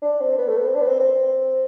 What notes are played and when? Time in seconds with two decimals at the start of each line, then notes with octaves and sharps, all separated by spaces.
0.02 D4
0.20 C4
0.38 B3
0.48 A3
0.57 B3
0.66 C4
0.75 D4
0.81 B3
0.87 C4
0.99 C4